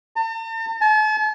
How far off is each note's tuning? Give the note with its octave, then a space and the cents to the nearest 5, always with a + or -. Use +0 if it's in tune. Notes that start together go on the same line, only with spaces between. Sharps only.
A5 +45
A5 -45